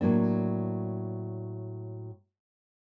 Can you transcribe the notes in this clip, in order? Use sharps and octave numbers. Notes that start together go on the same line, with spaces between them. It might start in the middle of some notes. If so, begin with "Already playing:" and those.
A2 F#3 A#3 D4